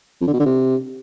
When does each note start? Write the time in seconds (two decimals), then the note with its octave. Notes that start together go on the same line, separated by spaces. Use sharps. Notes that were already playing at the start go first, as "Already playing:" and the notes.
0.21 F2
0.27 D3
0.33 B2
0.39 D3
0.46 C3